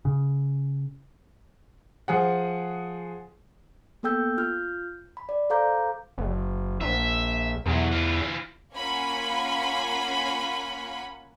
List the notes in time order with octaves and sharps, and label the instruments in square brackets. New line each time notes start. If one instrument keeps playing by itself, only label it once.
[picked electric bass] C#3
[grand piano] F3 G#4 F#5
[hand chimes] A#3 B3 A4 G5 E6 G6
F4 F6 G6
B5
D5
A4 C5 F5 A#5 D6 G6
[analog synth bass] F#1
[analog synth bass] A#1 [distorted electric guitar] E5
[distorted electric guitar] B1 F#3 [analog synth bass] E2
[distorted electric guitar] E3 F4
[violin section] A#3 C#4 F4 F#5 G#5 B5